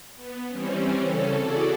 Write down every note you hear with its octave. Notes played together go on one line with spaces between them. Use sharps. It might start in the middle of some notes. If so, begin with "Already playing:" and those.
B3
E3 G3 C4 C#4
C#3 C#4 A4
E4 F#4 G#4 A4 D5